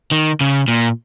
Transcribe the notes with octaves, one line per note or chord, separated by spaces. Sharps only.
D#3
C#3
A#2